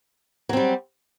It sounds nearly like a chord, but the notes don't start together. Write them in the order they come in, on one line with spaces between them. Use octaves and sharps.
F#3 C4 G3